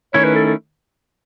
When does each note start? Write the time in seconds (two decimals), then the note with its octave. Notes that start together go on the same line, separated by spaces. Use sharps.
0.14 D#3 A3 C#4 E4 C#5
0.24 B4
0.35 A4
0.46 A4